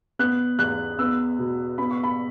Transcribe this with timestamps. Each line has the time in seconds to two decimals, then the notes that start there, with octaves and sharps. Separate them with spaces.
0.19 B3 F#6
0.59 E2 F#6
0.99 B3 E6
1.39 B2
1.78 B3 B5
1.91 C#6
2.04 B5